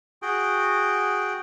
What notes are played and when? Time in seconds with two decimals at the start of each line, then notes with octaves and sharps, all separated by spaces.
0.22 F#4 G#4 G5